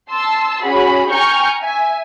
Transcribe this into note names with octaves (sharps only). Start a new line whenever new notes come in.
A5 C6 E6
C#4 F#4 G#4 B5
G5 G#5 A#5 C#6 F6 G6
E5 G#5